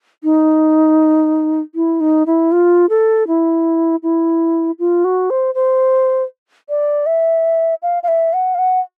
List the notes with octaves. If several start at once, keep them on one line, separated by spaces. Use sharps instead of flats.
D#4
E4
D#4
E4
F4
A4
E4
E4
F4
F#4
C5
C5
D5
E5
F5
F5
E5
F#5
F5
F#5